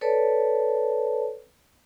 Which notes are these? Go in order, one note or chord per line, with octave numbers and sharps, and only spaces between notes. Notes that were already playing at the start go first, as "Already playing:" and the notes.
A4 B4 C#5 D5 A5